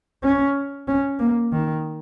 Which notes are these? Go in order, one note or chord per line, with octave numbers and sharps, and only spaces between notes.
C#4
C#4
A#3
D#3